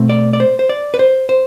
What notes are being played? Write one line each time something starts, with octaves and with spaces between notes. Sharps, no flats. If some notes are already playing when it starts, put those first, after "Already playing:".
Already playing: B2 A3 C4
D5
D5
C5
C5
D5
B4
C5
C5